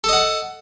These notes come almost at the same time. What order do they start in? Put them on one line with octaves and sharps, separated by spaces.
A4 D#5 F#5